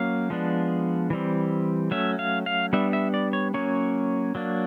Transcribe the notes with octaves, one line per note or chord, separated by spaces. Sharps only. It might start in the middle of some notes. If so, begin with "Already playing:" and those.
Already playing: F#3 A#3 C#4 F5
F3 G#3 B3 D4
E3 G3 C4
F#3 A3 C#4 E5
F5
F5
G3 B3 D4 E5
E5
D5
C#5
F#3 A#3 C#4 C#5
F#3 A#3 D4